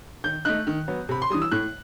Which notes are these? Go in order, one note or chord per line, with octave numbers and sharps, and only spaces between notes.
D#3 G6
A3 D#4 F#6
D#3
F#3 B3
C3 B5
C6
E3 G3 D#6
E6
A2 F#6